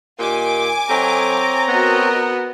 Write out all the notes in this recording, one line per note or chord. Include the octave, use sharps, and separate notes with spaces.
A#2 D#3 G4 G#5 D6
F#3 C4 A4 C#5 D#5 A#5 G6
B3 F#4 A#4 D#5